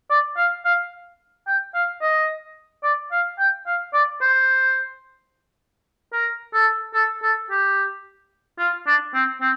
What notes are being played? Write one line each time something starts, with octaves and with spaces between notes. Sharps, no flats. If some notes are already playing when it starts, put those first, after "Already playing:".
D5
F5
F5
G5
F5
D#5
D5
F5
G5
F5
D5
C5
A#4
A4
A4
A4
G4
F4
D4
C4
C4